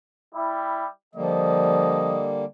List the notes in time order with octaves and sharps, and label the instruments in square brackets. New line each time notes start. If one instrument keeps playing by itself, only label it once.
[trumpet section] G3 E4
[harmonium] D3 G3 A#3 [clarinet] F3 [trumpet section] D#5